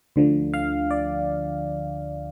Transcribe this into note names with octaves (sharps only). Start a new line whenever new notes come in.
D2 D3 F3
F5
D5